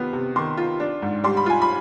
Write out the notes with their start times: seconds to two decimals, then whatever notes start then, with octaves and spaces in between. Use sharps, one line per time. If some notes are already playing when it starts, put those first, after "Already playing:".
Already playing: C3 D#3 B3 F4 B5
0.13 C3
0.36 D#3 C6
0.57 F4
0.80 D4
1.02 G#2
1.24 G3 C6
1.37 B5
1.46 F4 G#5
1.62 B5